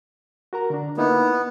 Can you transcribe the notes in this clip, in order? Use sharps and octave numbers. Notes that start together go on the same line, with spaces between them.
F#4 A#4 A#5
D3 D4
A#3 B3 D#4 E4